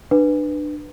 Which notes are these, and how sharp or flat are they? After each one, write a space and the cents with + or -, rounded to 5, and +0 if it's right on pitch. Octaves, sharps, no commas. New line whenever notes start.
D4 +30 B4 +0